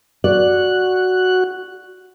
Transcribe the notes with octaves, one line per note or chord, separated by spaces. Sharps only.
F#4 D5 F#6